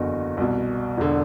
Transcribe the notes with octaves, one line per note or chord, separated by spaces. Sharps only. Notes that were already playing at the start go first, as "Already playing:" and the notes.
Already playing: F#1 E2 D3 F#4
C2 B2
E1 D3